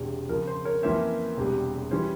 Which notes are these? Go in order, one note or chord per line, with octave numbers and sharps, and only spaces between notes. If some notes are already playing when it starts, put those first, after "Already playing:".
Already playing: E1 E2 C3
F2 C#3 F3 A#4
C5
A#4 C#5
F2 E3 A#3 C#4 C5 E5
E1 E2 C3 G3
E3 G3 C#4 C5